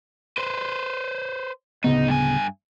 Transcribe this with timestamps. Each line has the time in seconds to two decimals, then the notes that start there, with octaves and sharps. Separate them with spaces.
0.38 B4 C5
1.84 D1 C#3 B3 D#4
2.08 G2 G#5